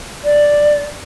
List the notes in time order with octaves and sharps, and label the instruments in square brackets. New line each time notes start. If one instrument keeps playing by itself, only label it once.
[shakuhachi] D5